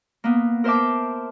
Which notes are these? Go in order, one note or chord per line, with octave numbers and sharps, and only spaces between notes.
A#3 B3
A#4 C5 E5 A5 D6